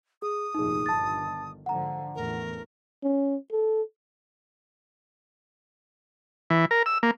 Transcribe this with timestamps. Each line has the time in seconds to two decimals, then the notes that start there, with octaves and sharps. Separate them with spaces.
0.22 G#4 D#6
0.55 F1 A#1 D#2 D#4 G#4
0.86 G1 D#3 A5 A6
1.66 G#2 D3 F3 F#5 A#5
2.15 A1 E2 A3 A#4
3.03 C#4
3.52 A4
6.50 E3
6.71 A#4
6.86 E6
7.03 A#3